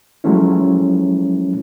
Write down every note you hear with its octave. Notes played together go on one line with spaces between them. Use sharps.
F3 F#3 G#3 A3 C#4 E4